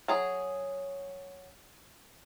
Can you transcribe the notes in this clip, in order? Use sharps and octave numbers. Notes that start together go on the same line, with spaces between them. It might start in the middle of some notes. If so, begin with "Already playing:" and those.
F#3 G#4